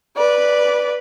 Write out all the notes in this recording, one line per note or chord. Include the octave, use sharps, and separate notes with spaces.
B4 D5